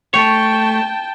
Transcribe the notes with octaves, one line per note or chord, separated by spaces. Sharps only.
A3 C#5 G5 A5